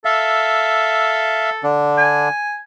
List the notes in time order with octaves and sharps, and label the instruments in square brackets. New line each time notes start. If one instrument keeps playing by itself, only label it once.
[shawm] A4 [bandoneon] E5 F5
[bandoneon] D3 D4
[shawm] G#5